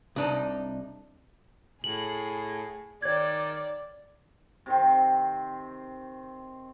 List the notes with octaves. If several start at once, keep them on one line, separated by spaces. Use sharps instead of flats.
C2 D4 D#4
A2 G#4 F#7
D#3 C#5 D5 G#6
C3 D#3 C4